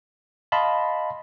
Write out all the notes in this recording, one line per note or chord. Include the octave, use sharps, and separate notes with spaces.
D#5 F5 A5 B5 C6